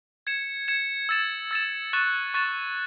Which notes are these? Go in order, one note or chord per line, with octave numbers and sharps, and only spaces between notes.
G#6 C#7 E7
G#6 C#7 E7
E6 A6 E7
E6 A6 E7
C#6 F#6 A6 E7
C#6 F#6 A6 E7